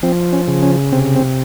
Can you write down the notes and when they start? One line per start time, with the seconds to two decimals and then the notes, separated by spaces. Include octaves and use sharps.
0.03 F3 C4
0.32 C#4
0.48 C#3
0.62 C#4
0.92 C3 C4
1.16 C4